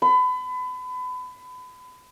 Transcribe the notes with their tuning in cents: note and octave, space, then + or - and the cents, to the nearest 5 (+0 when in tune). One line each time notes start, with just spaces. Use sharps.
B5 +30